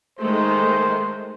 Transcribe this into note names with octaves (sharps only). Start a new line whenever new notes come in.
D#3 G#3 A3 C5